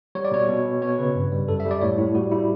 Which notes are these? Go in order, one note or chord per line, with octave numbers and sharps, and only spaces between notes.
G3 C#5
D5
B2 C#5
B2
B2
B3 C#5
C#3 B4
G2
G3
F#2 A4
E5
G3
D5
A2 C#5
A2 E4
G3 F#4
G3 E4